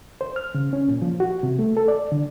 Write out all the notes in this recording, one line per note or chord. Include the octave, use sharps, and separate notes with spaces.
C5
F6
C#3
C#4
A#2
F3
F#4
C3
A3
A4
D5
D3